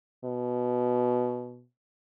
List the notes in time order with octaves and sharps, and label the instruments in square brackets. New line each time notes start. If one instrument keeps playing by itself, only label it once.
[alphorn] B2